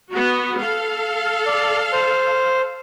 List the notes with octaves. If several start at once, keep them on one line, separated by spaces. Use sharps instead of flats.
B3 F#4
A4 F5
D5
C5